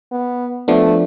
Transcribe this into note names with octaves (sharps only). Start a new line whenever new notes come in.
B3
F3 A3 B3 D4